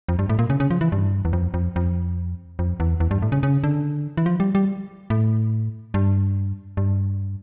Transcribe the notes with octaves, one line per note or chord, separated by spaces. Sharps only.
F2
G2
A2
A#2
C#3
C#3
F3
E3
G2
E2
F2
F2
F2
F2
E2
E2
G2
A2
C#3
C#3
D3
E3
F3
G3
G3
A2
G2
G2